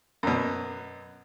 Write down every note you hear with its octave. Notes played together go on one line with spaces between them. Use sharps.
F#2 B2